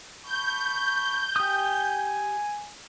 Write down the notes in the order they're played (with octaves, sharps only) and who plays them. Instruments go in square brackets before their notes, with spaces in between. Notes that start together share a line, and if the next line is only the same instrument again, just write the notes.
[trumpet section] A5 B5 C#6 [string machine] G6
[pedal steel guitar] G4 D#6 [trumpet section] G#5